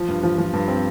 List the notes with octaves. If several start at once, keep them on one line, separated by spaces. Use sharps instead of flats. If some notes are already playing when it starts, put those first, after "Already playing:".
Already playing: F3
G2
F3
F3
G2
C4